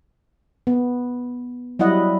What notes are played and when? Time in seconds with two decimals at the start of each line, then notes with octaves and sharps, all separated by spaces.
0.67 B3
1.79 F#3 G3 E4 D#5 F#5